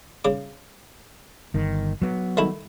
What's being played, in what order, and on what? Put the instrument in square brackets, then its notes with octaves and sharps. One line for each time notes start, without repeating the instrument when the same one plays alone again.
[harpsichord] C#3 D6
[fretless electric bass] G1 D#3
F#3 B3
[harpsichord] D#3 A3 E4